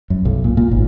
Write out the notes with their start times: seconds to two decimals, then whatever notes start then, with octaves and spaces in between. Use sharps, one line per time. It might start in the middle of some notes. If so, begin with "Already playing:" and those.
0.10 F#2
0.25 B1
0.44 A#2
0.57 A#2
0.71 G#1